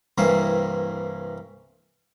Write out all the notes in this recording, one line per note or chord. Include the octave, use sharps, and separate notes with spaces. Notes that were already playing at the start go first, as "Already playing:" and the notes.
C2 G2 E3 A#3 C4 C6